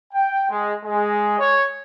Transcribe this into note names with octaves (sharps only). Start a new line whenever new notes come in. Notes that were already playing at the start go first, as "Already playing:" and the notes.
G5
G#3
G#3
C#5